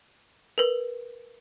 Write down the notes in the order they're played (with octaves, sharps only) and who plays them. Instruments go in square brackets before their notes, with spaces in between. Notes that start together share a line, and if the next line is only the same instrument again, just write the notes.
[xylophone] A#4 B4